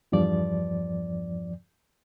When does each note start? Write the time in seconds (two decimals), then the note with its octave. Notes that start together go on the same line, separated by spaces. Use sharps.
0.12 E2 G2 F3 D5